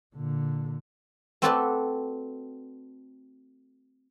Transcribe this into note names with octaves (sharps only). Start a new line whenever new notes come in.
A#2 D3
A3 C4 F#4 A4 B4 D5